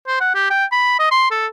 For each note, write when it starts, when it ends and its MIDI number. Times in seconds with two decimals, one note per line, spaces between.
0.07 0.17 72
0.20 0.29 78
0.34 0.49 67
0.50 0.65 79
0.72 0.96 83
0.99 1.09 75
1.11 1.30 84
1.30 1.47 69